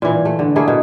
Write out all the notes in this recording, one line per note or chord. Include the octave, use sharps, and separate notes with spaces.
A#2 E3
A3
D3
A3 A#3 E4 G#4
B2